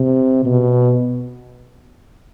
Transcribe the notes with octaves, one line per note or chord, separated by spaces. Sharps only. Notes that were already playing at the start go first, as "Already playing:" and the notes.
Already playing: C3
B2